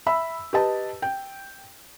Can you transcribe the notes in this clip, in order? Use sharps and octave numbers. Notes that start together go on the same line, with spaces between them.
E5 B5 E6
G4 B4 D#5 A5
G5